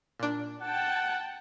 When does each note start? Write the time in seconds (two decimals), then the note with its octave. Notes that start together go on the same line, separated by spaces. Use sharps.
0.19 A#2 D4
0.62 F#5 G5 A5